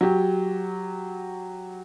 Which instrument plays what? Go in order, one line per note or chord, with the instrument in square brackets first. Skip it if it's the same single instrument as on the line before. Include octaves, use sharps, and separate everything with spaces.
[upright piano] F#3 G4